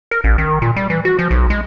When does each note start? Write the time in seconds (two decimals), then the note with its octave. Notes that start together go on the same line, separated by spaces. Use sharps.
0.11 A#4
0.24 A1
0.38 D#3
0.62 A#2
0.76 G3
0.90 E3
1.05 F#4
1.19 F3
1.31 B1
1.50 G#3